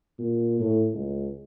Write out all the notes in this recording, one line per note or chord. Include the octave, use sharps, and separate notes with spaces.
A#2
A2
C#2